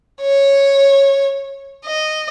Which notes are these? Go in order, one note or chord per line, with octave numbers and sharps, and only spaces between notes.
C#5
D#5